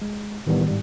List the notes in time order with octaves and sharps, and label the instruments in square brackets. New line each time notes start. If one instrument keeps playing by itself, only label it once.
[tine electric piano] G#3
A2 D#3 E3 G3 B3
G#2 G3